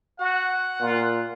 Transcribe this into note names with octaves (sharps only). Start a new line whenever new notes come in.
F#4 F#5
A#2 F4